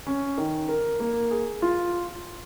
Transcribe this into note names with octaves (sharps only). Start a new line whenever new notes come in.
C#4
D#3
A#4
A#3
G#4
F4